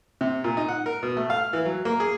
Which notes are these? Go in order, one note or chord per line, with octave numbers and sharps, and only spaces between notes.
C3
A#2
D#4
F#5
A#4
B2
A3
F5
E3
F#3
A#3
G#4